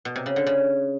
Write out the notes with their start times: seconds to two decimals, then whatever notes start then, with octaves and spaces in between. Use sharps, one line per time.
0.05 B2
0.16 C3
0.26 C#3
0.36 D3
0.46 C#3